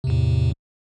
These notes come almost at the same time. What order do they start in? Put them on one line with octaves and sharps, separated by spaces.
C3 E2 A2